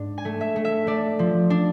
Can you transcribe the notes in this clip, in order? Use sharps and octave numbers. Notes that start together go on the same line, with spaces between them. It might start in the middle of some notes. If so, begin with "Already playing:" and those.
Already playing: G#2 D4
G#5
A3
E5
A3
E5
A3 D5
F3
D4